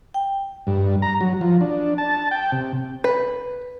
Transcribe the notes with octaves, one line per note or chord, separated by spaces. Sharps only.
G5
G2
A#5
F#3
F3
D4
A5
G5
C3
B4